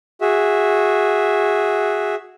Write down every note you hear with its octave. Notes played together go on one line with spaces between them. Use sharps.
F#4 G#4 E5